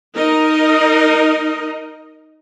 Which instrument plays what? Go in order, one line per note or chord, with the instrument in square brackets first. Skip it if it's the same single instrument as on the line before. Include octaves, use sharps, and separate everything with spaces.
[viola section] D#4 A#4 D#5